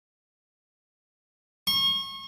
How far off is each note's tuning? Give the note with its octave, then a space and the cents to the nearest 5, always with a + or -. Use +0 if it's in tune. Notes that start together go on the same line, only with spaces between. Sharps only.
C#6 -35